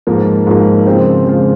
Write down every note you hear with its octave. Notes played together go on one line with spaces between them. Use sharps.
G#2 F3 A#3
G#2 F3 A#3
C#3 F3 G#3 C4 F4
C#3 F3 G#3 C4 F4